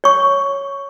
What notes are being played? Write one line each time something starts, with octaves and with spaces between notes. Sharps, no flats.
C#5 C#6